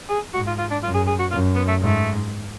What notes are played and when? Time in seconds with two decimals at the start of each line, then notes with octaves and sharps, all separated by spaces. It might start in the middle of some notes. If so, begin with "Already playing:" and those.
0.10 G#4
0.34 G#2 F#4
0.47 F4
0.59 F4
0.71 D4
0.83 F#2 F4
0.95 G#4
1.07 G#4
1.19 F#4
1.31 F#2 F4
1.56 B3
1.68 A3
1.80 G#2 A3